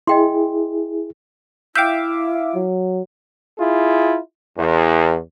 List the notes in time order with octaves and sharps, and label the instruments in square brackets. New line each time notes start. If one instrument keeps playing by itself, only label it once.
[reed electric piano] E4 G#4 [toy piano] D#5 G5 C6
[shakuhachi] E4 [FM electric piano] E5 F5 D6 [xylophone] G5 G6
[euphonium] F#3
[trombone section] E4 F4 G#4
E2